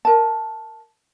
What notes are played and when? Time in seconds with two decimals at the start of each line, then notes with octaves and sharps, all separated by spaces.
0.05 A#4 A5